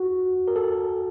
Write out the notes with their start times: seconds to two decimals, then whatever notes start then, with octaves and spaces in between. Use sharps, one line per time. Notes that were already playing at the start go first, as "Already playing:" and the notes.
Already playing: F#4
0.48 A#4
0.56 A4